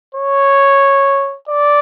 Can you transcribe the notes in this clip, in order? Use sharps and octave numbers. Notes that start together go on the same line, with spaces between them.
C#5
D5